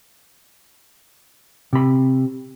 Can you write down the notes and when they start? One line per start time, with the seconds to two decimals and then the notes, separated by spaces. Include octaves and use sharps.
1.73 C3 B5